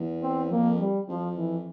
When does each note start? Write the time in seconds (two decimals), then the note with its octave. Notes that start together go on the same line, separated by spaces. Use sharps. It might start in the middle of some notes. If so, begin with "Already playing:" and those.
Already playing: E2
0.22 C4
0.51 F2 A#3
0.80 G3
1.08 F2 F3
1.37 E3